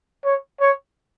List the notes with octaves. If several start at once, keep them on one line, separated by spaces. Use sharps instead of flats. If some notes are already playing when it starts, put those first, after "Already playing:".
C#5
C#5